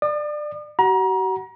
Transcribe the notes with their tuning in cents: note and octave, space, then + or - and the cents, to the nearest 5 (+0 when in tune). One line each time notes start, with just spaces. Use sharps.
D5 +20 D#6 -45
F#4 +45 F#5 +0 A#5 +30